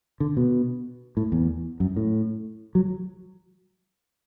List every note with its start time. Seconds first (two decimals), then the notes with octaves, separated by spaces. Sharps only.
0.20 D3
0.37 B2
1.17 A2
1.32 E2
1.80 F#2
1.97 A2
2.75 F#3